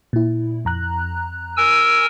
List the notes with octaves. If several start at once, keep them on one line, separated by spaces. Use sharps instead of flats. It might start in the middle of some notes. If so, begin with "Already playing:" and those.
A#2 E4
F2 A#5 F#6
A#4 G#5 E6